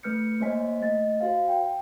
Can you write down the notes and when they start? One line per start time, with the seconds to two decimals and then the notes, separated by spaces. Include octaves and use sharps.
0.03 A3 B4 F6 G6 C#7
0.40 A#3 C5 C#5 D#5 G#5 B6
0.81 A3 D#5 A6
1.21 F#4 C5 F5
1.48 G5